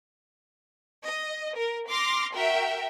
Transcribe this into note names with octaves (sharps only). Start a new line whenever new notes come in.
D#5
A#4
C6 D6 F6 A#6
F#4 A#4 E5 G5